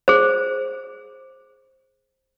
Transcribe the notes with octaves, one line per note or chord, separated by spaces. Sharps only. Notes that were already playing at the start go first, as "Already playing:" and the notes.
G#4 C5